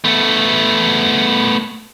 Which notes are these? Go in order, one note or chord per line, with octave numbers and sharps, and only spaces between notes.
A3 B3